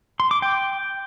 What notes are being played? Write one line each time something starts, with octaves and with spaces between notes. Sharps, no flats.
C6
D6
G5